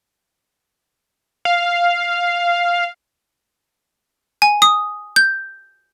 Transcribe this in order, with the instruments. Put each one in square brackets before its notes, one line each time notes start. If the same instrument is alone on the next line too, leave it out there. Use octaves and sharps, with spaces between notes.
[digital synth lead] F5
[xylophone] G#5
D#6
G6